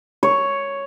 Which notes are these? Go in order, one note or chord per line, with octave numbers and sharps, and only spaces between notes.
C#5